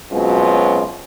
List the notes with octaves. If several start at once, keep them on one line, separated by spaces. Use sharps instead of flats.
F#2 B2 F#3 G#3 C4 F4